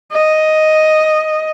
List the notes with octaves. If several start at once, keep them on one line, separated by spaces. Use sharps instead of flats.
D#5